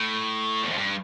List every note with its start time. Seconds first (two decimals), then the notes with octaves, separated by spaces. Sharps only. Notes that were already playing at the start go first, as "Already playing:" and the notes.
Already playing: A2
0.63 E2
0.70 F2
0.78 G2